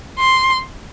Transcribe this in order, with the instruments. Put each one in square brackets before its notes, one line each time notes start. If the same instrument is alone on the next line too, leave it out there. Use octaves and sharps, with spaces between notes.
[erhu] C6